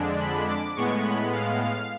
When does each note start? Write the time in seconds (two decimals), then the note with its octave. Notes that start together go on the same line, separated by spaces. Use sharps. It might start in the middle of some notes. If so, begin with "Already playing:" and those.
Already playing: F2 D3 G#3 D4
0.19 B5
0.48 D6
0.76 A2 G#3 B3 C#6
1.04 B5
1.33 F5
1.62 F5